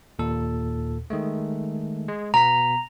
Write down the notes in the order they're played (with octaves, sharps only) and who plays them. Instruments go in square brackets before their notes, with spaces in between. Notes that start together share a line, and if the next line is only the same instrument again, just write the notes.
[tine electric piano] D#2 A#2 A4
D#3 G#3 A3
G#3
[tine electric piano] B2 B3 B6 [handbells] A#5